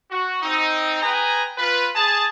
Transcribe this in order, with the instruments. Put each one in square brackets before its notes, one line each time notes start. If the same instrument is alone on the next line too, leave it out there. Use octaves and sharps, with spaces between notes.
[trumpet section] F#4
C4 D#4
G#4 B4 G5 G#5 A#5
F4 B4
G#4 A5